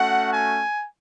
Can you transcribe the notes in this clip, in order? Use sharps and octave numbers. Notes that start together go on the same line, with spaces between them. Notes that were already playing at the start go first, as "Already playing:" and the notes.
Already playing: A3 C#4 F#4 F#5
G#5